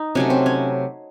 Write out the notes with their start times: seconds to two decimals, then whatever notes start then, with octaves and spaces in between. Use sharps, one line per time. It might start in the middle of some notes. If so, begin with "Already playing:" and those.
Already playing: D#4
0.15 C3 F#3 A3 C#4
0.30 C4
0.46 C#4